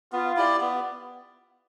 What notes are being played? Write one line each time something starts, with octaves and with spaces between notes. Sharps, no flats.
B3 F4
E4 G4 D5
B3